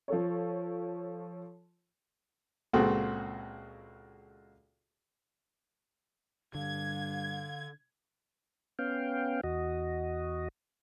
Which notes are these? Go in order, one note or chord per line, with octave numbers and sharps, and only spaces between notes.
F3 A4 C#5
C#2 A#2 C4 F#4 G#4 A4
G2 D3 F5 G#6
B3 C#4 F5 G5
E2 F#4 D#5